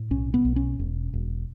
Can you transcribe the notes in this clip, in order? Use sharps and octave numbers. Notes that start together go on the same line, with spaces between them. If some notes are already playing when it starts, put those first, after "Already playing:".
Already playing: A2
B1 C#4
B3
B1
C#4
E1
E1